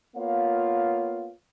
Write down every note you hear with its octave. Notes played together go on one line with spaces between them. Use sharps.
A#3 B3 F4 C#5 F5